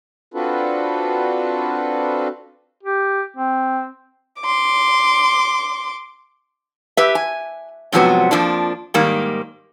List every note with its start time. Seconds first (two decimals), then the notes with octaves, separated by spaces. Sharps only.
0.34 C4 D4 F4 F#4 A4 B4
2.83 G4
3.37 C4
4.41 C6 D6
6.97 G4 B4 E5
7.15 G#5
7.92 G#2 C3 F3 F#3 B3 F#4
8.31 F2 F3 A#3 D4
8.94 G#2 D#3 G3 A#3